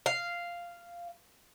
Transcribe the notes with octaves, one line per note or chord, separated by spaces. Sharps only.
F5